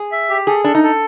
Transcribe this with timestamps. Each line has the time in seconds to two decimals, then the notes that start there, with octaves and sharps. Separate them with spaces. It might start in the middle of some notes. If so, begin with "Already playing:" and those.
Already playing: G#4
0.12 E5
0.29 G4
0.47 G#4 A4
0.64 D4 A4
0.75 D#4
0.83 A4